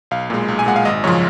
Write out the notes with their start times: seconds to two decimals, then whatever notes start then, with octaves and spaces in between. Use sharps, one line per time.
0.11 B1 F5
0.30 A#2 G#3
0.48 B1
0.59 G#5
0.66 A#2 G#3 F#5
0.76 F5
0.85 G#1 D#5
1.04 F#2 C#3 F3 C#5